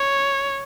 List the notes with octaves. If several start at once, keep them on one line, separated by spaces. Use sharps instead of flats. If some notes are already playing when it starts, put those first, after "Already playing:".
Already playing: C#5